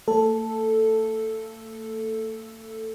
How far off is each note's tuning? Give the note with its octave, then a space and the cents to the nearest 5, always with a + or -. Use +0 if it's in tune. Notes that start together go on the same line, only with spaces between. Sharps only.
A3 +45 A4 +0